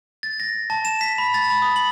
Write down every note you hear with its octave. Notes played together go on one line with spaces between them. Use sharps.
A6
A#6
A5
E7
B6
B5
A6
B5
D#6
F#7